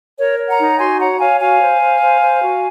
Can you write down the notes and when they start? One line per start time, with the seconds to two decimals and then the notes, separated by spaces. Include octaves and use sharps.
0.19 A#4 C#5
0.39 C#5
0.49 F#5 A#5
0.59 D#4
0.80 F#4 G#5 C6
1.00 C#5 F#5 A#5
1.20 C#5 F5 G#5
1.40 F#4 F5 G#5
1.61 C5
1.81 C5
2.01 C5
2.22 C5
2.42 F#4